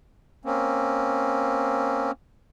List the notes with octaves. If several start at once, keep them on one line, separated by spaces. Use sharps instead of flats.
A#3 C4 C#4